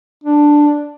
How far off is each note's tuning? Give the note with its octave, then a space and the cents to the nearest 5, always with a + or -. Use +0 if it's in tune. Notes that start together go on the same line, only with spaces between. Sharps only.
D4 +5